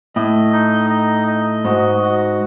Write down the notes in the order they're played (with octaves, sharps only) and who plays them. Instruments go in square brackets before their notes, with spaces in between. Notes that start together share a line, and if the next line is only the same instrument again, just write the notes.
[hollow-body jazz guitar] A2 [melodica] D#5
[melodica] D#4
D#5
D#5
[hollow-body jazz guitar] G#2 [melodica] F#4
[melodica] F#4